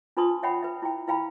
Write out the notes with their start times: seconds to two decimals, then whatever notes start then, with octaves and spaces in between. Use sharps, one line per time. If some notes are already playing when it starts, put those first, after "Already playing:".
0.17 D4 F4 B4 A5 C6 D#6
0.43 C#5 E5 F#5 G5 B5
0.63 B4 E5
0.82 E4 G5
1.07 E4 B4 F5 G5 B5